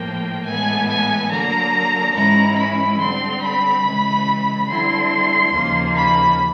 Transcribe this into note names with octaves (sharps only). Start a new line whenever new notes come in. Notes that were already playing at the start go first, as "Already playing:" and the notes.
Already playing: A2 F3 A#3 G5
A2 E3 G#3 B3 G#5
G#5
D3 F#3 A#3 A#5
G#2 E3 G#3 C#4 E4 A#5
B5
D3 G3 C4 C6
B5
C#3 E3 G#3
D3 G3 C4 E4 C6
D#2 C#3 F3 A#3
B5